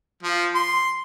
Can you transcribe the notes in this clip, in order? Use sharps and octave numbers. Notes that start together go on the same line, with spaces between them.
F3
C6